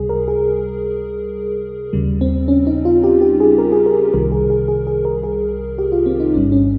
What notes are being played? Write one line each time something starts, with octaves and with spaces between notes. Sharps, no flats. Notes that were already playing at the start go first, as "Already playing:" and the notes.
Already playing: C#2 C3 G3 G#4
A#4
G#4
D#2 C#3 G3
C4
C#4
D#4
F4
G4
G4
G#4
A#4
G#4
A#4
G#4
C2 C3 D#3 G3 A#4
G#4
G#4
G#4
G#4
A#4
G#4
G4
F4
C4
D#4
G1 G2 G3 C#4
C#4